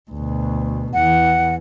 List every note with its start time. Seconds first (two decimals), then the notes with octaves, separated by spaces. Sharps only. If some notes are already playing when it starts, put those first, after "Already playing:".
0.11 D2 B2
0.93 E2 E3 F#5